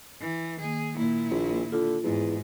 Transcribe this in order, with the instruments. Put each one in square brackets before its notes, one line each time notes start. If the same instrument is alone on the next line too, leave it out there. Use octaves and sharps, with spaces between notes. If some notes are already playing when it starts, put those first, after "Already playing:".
[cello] E3
[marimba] D#3 A#3 [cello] G#4
[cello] A#2 E4 [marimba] A#3
[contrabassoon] A#1
[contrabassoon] D3 [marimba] F4
[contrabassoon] E2 [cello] G#2